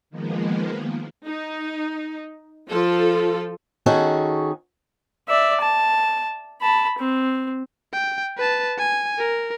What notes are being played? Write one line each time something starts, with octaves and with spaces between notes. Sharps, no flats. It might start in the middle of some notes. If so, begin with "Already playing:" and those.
D#3 F3 G#3 A#3 B3
D#4
F3 F4 A4
D#3 C#4 F#4 G#4 A4
D5 E5
A5
A5 B5
C4
G5
B4 A5
G#5
A#4